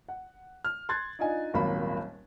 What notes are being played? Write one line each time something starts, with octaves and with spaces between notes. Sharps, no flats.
F#5
F6
C6 F#6 G#6 A6
D4 D#4 F4 D#5 G#5
D#1 G#1 F#3 A#3 B5